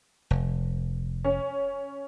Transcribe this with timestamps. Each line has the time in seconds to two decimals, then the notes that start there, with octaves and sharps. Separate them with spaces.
0.31 F1
1.24 C#4